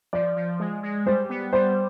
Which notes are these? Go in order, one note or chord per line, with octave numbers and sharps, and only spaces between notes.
F3 D5
F3
G#3
G#3
G3 C5
B3
G3 C5